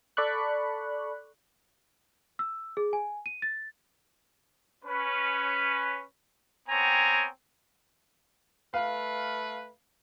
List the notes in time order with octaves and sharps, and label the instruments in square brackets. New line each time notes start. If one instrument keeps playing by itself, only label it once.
[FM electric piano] A4 D5 B5 C#6 F#6
[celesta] E6
G#4
G#5
D#7
A6
[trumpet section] C#4 B4
B3 C4 C#5 G5 G#5 A#5
[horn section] A3 B4 [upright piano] F5